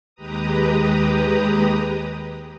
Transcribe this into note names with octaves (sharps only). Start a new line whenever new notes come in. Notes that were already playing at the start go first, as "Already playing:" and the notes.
D#2 G#3 G4 B4 A#5 D#6